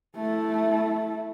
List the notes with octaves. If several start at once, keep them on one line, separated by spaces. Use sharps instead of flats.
A3 E4